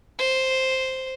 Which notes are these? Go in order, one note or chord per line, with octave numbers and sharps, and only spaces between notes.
C5